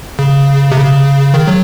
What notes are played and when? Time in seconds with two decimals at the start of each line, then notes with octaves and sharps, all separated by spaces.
0.19 C#3
0.72 C3
0.77 C#3
1.34 D#3
1.48 F#3